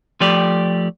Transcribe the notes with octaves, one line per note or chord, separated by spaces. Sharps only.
F3 A3 G4 D5